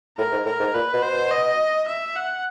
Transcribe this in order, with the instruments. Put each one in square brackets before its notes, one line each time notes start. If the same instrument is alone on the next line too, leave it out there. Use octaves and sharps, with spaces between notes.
[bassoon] A2 [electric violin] A#4
[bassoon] G#2
[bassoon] A2 [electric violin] A#4
[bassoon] G#2
[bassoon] A#2 [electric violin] B4
[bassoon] B2
[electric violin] C5
[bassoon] B2
[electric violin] D#5
E5
F#5